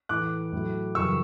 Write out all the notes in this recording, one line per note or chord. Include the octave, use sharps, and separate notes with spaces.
A2 E3 A3 D6 F#6
A2 F#3 A3
F#2 C#3 E3 G3 C#6 E6